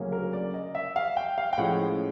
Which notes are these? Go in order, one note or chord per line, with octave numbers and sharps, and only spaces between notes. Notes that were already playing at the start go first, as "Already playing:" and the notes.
Already playing: D2 C#3 F#3 A#3 C#4
A#4
D5
D#5
E5
F5
G5
F5
G5
A2 F3 G#3 C#4 F#5